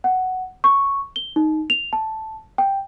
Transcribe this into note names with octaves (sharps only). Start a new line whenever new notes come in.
F#5
C#6
G7
D#4
F7
A5
G5